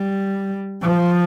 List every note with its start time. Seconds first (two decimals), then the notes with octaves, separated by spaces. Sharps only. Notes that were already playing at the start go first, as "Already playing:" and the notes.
Already playing: G3
0.81 F3